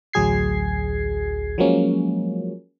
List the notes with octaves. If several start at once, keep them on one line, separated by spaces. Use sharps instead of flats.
A1 D2 F#3 G#4 G#6 C7
F3 F#3 G#3 A#3 C#4